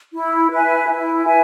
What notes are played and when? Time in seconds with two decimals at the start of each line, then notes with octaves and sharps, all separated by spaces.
0.14 E4
0.51 B4 E5 G#5
0.88 E4
1.25 B4 E5 G#5